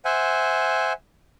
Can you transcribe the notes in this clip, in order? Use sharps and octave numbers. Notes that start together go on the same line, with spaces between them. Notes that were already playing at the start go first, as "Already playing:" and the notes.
C5 E5 F#5 G#5